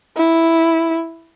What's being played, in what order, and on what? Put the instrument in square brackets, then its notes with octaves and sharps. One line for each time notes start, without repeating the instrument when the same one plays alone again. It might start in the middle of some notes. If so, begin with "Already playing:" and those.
[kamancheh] E4